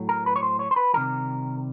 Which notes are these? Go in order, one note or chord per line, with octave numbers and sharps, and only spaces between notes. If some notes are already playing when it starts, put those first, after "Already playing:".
Already playing: A2 F#3
A#4
B4
C#5
C5
C#5
C5
B4
C3 D#3 G3 A#4